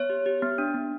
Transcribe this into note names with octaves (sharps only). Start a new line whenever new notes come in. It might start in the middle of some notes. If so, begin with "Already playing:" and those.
Already playing: B3 C#5
G4
G4
B3
D4
B3